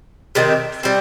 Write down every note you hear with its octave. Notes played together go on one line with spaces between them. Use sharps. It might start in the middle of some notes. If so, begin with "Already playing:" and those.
C3 D#3 G3 C4
G3 C4